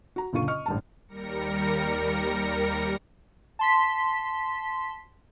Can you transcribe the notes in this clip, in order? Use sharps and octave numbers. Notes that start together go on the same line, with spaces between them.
F#4 A#5
F#1 A#2 D3 F4 C#6 D#7
D#5 C#6 F6
A1 G2 A5
D#2 G3 A#4 A#6 C#7
A5 C6 B6